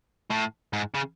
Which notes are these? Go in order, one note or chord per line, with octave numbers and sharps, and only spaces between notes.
A2
G#2
C#3